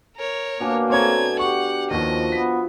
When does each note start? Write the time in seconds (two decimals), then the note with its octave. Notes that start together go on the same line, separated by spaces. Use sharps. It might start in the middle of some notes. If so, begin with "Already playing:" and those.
0.16 A#4 C#5
0.60 B2 A#3 D4 G#5
0.90 A3 C4 C#5 A#5 G#6
1.39 G4 F#5 C#6
1.91 D#2 F3 F#4 A4 D#5
2.32 B3 B6